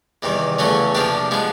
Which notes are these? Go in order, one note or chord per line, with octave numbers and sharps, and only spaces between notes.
E2 C3 D#3 G3
E2 C#3 F#3 A3 C#4
C3 F3 A#3 D4 G4
F3 G#3 B3